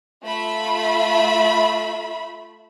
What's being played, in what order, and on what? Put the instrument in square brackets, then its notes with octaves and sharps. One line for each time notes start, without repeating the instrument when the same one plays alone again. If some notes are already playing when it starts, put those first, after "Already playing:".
[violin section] A3 F4 E5 B5